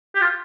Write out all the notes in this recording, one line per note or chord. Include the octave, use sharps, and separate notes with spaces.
G4
F4